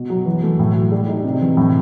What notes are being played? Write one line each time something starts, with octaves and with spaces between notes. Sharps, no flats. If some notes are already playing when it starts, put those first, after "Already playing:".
Already playing: B2
F#3
E3
A3
A2
F#3
G3
D#4
C3
E3
A2